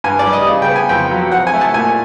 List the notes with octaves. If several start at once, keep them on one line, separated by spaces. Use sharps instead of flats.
G2 G#5
D5
G3
D#5
C#3
G5
B3
G#5
F2 G5
F#3
C4 F#5
G#5
A3
A5
A#2 G#5